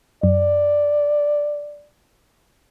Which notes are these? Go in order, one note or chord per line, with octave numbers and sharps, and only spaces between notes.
F#2 D5